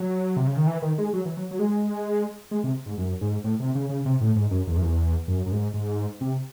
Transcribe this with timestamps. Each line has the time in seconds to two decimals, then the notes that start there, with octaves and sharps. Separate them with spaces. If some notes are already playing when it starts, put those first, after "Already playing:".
Already playing: F#3
0.36 C3
0.47 C#3
0.57 D#3
0.67 E3
0.82 D#3
0.98 G#3
1.13 F#3
1.25 E3
1.37 F#3
1.51 F#3
1.59 G#3
2.51 G#3
2.64 C3
2.86 G#2
2.98 F#2
3.21 G#2
3.44 A2
3.60 C3
3.75 C#3
3.89 C#3
4.05 C3
4.21 A2
4.36 G#2
4.51 F#2
4.67 E2
4.77 F#2
4.82 E2
5.28 F#2
5.46 F#2
5.52 G#2
5.74 G#2
6.21 C3